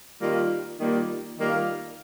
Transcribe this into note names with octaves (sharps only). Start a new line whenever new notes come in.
D#3 G3 A#3 F4
D#3 G3 A#3 F4
D#3 G3 A#3 F4